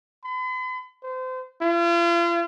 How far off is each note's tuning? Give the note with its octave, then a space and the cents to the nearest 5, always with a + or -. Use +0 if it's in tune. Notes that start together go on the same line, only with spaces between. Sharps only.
B5 +45
C5 -30
F4 -40